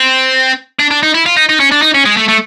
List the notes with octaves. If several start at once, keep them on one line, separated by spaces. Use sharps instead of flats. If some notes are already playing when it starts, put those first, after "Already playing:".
Already playing: C4
D4
D4
D#4
E4
F4
D#4
D#4
C#4
D4
D#4
C#4
G#3
A3
A3